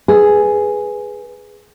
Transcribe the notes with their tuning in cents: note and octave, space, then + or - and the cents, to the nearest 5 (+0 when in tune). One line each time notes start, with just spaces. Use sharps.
G#4 +0 B4 +0